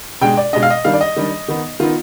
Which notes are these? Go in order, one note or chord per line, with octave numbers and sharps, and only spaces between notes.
B2 G#3 D4 G5
D5
B2 G#3 D4 D#5
F5
D#5
D#3 G3 D4 F5
D5
D#5
D#3 G3 D4
D#3 B3 D#4
D#3 B3 D#4 F4